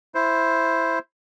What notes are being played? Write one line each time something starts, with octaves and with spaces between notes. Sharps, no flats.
E4 C5